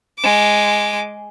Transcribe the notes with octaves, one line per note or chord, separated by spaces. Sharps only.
G#3 D6